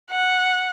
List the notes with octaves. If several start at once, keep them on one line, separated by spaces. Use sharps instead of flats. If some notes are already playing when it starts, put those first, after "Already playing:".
F#5